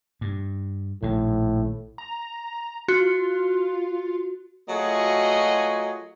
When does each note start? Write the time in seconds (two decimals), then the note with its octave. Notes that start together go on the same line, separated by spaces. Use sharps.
0.21 G2
1.03 A#1 A2 D#3
1.98 A#5
2.88 F4 F#4
4.69 F#3 A3 F4 F#4 G#4 D#5